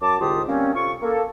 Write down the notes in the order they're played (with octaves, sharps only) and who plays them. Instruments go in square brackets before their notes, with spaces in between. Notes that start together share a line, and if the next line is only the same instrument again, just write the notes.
[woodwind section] F#2 A5 D6
C2 G#2 D3 F4 G4 D#6
G3 A#3 C4 C#4
C3 F4 A4 C#6
A#3 A4